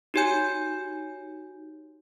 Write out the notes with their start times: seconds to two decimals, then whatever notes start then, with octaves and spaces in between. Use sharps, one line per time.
0.14 D#4 F#4 G4 C#5 G#5 G6